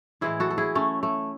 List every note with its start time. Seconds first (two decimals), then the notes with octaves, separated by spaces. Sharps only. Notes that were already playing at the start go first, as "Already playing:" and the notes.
0.21 A2 E3 G#3 E4 G#4
0.40 F#4 A4
0.50 A4
0.58 E4 G#4
0.75 A3 C#4
1.03 A3